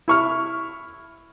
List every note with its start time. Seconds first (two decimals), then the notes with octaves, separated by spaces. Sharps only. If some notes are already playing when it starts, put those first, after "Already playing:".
0.08 E4 C#6 F6